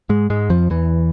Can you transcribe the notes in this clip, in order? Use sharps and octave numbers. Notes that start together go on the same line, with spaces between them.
G#2 G#3
G#2 G#3
F2 F3
E2 E3